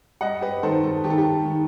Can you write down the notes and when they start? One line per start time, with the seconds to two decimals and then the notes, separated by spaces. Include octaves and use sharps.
0.21 G3 D#5 F#5
0.41 G4 B4
0.63 D#3 A4 C5
0.83 A4
1.04 D#3 G4
1.10 A4
1.18 G4
1.45 D#3